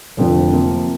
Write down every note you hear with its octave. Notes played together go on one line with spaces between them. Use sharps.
F1 F2 D3 F3
C3 F3 A#3